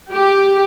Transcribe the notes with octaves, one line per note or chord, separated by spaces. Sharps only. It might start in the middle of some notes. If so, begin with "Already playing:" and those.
G4